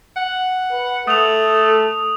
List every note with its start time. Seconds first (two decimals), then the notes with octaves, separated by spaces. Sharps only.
0.17 F#5
0.71 B4
1.07 A3 A4 D#6 F7